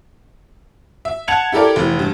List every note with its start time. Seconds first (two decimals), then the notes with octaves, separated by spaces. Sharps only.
1.05 E5
1.28 F#5 A5 G#6 C#7 F7 F#7
1.52 E4 G4 A4 A#4 D5
1.76 F1 E3
1.99 G2